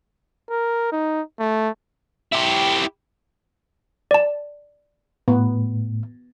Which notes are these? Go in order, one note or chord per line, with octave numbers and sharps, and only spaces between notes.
A#4
D#4
A3
E4 G4
D5 A5
A2 B3